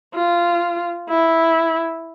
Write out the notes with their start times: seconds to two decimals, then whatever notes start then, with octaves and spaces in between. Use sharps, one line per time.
0.15 F4
1.09 E4